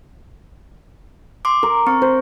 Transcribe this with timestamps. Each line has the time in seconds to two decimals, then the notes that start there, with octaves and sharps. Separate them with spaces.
1.45 C6 D6
1.63 A#4
1.87 C4 C#6
2.02 C5